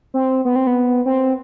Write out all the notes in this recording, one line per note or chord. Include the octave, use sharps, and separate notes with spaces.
C4
B3
C4
B3
C4